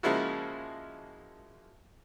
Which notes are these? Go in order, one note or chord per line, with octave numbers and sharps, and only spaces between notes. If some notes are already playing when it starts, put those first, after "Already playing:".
C#3 F3 G#3 A#3 E4 F#4